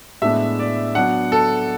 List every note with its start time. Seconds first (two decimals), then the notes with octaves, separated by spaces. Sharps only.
0.22 A2 G#3 B3 D4 E5
0.59 D5
0.95 F#3 B3 D4 F#5
1.32 A4